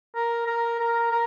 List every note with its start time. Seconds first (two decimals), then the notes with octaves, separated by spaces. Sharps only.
0.15 A#4
0.47 A#4
0.79 A#4
1.11 A#4